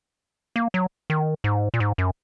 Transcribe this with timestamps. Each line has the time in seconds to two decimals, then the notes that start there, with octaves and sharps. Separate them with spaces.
0.56 A#3
0.74 F#3
1.10 D#3
1.44 G#2
1.74 A#2
1.80 G#2
1.98 F#2